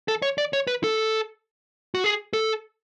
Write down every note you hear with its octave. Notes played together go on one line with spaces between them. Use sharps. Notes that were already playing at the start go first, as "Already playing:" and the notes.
A4
C#5
D5
C#5
B4
A4
F#4
G#4
A4